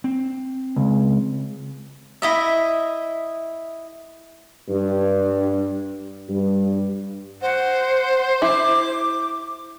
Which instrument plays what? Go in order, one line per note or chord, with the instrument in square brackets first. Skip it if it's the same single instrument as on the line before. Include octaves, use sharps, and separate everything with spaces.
[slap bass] C4
[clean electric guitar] C#2
[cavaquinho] E4 D#5 E5
[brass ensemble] G2
G2
[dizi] C5 [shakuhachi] F#5
[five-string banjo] E4 [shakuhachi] D6